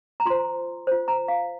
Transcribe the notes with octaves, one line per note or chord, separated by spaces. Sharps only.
A#5
F4 C5 C6
F4 C5
A#5
F5